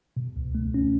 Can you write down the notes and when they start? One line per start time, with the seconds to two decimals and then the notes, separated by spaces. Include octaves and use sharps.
0.17 B2
0.36 C#2
0.55 A3
0.74 C#4